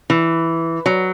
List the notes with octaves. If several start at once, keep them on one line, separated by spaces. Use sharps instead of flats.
E3
F#3